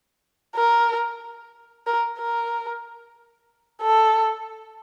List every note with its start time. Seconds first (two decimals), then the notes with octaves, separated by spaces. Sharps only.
0.56 A#4
1.87 A#4
2.19 A#4
3.82 A4